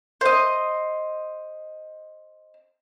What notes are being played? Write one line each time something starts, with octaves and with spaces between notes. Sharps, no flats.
C5 D#5